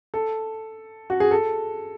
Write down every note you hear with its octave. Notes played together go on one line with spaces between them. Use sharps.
A4
F#4
G#4
A4